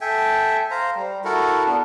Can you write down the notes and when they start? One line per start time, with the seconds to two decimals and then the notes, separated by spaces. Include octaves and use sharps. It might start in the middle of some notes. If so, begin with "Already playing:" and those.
0.01 A4 E5 G5 G#5
0.71 C5 F5 A#5
0.95 G3
1.24 E4 F#4 A4 A#4
1.65 B3 D4 A4